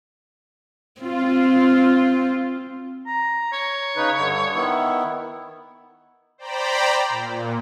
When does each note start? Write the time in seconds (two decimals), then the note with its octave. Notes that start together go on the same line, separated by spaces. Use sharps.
1.02 C4 F4
3.06 A#5
3.52 C#5
3.96 C#3 D#4 B4
4.17 G2 D3
4.55 D#3 B3 E4
6.38 C5 D5 G5 A#5 B5
7.09 A#2